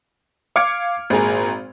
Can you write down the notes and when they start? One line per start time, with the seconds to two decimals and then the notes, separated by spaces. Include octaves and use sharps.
0.56 F5 D6 F6 G#6 C#7 D7
1.10 G#1 A#2 G#4 A#5